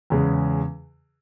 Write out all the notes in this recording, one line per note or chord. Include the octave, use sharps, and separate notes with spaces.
E2 C#3 G#3